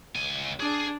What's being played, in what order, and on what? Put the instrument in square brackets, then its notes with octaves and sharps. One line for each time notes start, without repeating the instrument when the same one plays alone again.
[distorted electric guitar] C#2 G#5
[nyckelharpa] D4 [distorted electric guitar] G#4